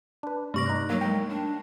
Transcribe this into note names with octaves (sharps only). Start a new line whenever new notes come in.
D4 B4
G2 C3 A3 C#6 D6 A#6
D#4 F#6
F#3 A#3
G#3 A#4 G5
D4